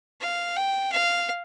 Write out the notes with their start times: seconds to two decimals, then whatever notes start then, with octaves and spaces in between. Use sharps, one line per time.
0.21 F5
0.56 G5
0.92 F5